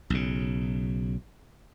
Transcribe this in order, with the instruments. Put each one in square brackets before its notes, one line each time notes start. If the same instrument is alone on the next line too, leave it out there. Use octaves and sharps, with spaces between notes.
[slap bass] B1 C#3